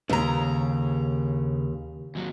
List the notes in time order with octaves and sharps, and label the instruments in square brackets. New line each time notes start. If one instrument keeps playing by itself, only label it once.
[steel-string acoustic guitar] D#2 A#5 [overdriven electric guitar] C#3
[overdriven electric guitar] D#2 F#3